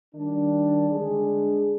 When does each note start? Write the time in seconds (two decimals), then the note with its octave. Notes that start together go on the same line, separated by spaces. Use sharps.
0.15 D#3 G3 D4
0.90 D3 G#3 D4 G#4